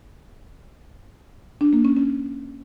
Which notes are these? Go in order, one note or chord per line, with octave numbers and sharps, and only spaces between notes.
D4
A#3
C#4
C#4